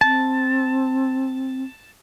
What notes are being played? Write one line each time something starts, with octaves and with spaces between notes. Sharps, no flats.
C4 A5